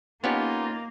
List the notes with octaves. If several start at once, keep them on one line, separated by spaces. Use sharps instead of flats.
A#3 B3 C#4 D#4 F4 G4